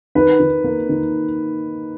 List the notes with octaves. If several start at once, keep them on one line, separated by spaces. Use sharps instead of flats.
D#3 B4
D#3
A#3
D#3